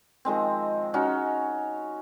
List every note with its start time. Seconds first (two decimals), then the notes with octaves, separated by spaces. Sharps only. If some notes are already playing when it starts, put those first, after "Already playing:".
0.25 D#3 F3 G#3 C4
0.94 C#4 D#4 F#4